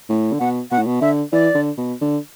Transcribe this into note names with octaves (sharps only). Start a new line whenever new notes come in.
A2
D3
B2 F#5
B2 F#5
A2
B2
D3 E5
E3 D5
D3
B2
D3